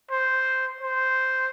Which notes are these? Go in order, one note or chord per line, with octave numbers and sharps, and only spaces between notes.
C5
C5